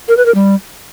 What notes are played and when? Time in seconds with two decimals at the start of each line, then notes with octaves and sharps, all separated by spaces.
0.08 A#4
0.17 B4
0.26 A#4
0.35 G3